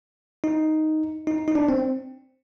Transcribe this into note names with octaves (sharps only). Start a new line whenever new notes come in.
D#4
D#4
D#4
D4
C4